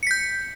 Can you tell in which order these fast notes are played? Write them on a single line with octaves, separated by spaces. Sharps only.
C#7 B6 G6